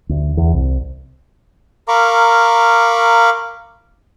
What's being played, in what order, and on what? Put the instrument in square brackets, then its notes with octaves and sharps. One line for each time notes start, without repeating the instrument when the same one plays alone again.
[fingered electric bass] D2
E2
C2
[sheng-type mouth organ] A#4 F5 A#5 B5 C#6 D6